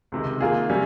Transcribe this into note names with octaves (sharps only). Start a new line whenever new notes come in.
C#2 C3 D#3
D#3 A#3 F4 G#4
C3 G3 C#4